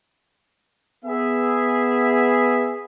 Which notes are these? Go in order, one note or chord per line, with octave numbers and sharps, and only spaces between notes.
B3 G#4 E5